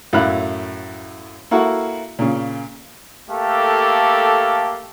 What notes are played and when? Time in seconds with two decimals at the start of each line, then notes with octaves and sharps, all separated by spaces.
0.13 F#2 A2 E4 F5 B5 F#6
1.51 A#3 E4 F#4 A4
2.19 A#2 C#3
3.30 A3 A#3 G4 A4 F5